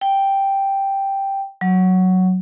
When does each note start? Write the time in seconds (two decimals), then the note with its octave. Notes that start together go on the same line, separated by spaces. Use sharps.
0.01 G5
1.61 F#3